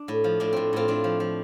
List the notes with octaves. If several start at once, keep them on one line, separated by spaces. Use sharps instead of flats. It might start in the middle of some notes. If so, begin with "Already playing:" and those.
Already playing: D4
A2
F3
A2 D4
A2 C4
A2 C4 F4
A2 D4
F3
F3